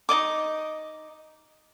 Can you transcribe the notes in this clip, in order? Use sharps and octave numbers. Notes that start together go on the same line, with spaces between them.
D#4 D5 D#5 D6